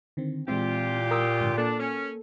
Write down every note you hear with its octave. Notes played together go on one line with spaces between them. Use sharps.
D3 D#3 C4
A#2 E3 G#3 C4 E4 F4 G4
A#4 D#6 E6
G#2 D3
A#3 D4 A4
C#4